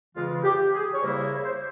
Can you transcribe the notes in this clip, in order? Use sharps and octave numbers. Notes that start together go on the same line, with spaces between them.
F2 C#3 E3 G#3 F4
G4
G#4
C#5
E2 C#3 G3 A#3 E4 C5
C#5
C5